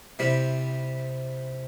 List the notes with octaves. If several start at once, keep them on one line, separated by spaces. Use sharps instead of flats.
C3 G3 C4 E4